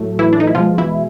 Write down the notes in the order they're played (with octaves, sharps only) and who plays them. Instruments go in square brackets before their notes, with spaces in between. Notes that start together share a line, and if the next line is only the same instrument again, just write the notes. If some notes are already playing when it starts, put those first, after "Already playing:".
Already playing: [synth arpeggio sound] A2 F#3 A3
E3 E4
D4
D#4
E4
B2 F3 G#3 F4
E3 E4